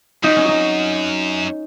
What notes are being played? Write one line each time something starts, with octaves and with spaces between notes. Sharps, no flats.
F#2 D#4
C#4
D#4